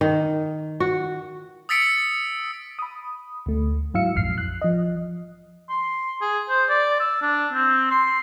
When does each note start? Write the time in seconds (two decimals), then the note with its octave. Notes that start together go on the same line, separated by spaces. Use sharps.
0.01 D#3
0.80 F#4
1.69 D#6 E6 A6 B6 C#7 D7
2.79 B5 D#6
3.46 D2 A3
3.94 G#2 F#3 E4 F5 E6 C#7
4.15 A#1 F2 G#2 F6 C7
4.38 F#6
4.62 F3 D#5
5.69 C6
6.21 G#4
6.49 C5
6.69 D5
7.00 E6
7.22 D4
7.53 C4
7.91 C6